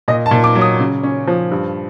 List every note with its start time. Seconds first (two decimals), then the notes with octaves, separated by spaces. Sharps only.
0.08 A#2 D#5
0.26 A5
0.31 A#2
0.44 D6
0.55 F#3
0.61 D#6
0.79 C#3
1.03 C#4
1.27 F3
1.51 G2